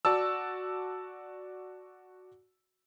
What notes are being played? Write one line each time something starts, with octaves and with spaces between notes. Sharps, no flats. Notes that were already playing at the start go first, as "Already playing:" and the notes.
F#4 D5 A5 E6